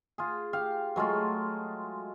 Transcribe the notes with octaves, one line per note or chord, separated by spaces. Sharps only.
F4 G#4
G4 F5
F#3 G#3 A3 F4